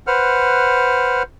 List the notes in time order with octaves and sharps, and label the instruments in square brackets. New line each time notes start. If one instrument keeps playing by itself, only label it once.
[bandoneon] B4 C5 F#5 F6